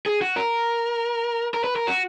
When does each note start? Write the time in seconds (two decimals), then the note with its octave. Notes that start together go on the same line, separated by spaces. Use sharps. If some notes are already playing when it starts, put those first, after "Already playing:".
0.06 G#4
0.21 F#4
0.36 A#4
1.54 A#4
1.64 B4
1.76 A#4
1.87 F#4